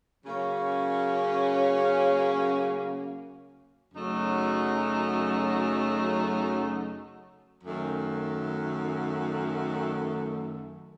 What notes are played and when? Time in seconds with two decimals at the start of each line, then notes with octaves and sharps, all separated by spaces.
0.24 C#3 F#3 A#3 C#4
3.93 F#2 C#3 F#3 A3 D#4
7.63 F#2 D#3 A3